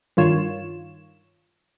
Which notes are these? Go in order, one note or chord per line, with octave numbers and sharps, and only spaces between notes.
G2 D#3 F4 C#5 E7